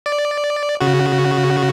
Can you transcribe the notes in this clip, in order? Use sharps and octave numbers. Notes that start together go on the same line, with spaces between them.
D5
C#3 F#4